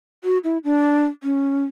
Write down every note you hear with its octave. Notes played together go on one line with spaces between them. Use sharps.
F#4
E4
D4
C#4